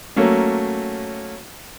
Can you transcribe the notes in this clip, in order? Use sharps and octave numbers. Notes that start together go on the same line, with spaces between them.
F#3 A3 A#3 C#4